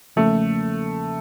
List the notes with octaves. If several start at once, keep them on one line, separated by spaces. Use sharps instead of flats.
E2 C#3 F3 A3 A#3 C#4